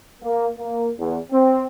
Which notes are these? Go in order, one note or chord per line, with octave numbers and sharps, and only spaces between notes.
A#3
A#3
E2
C4